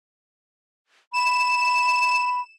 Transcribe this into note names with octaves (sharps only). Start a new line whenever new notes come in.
B5 E7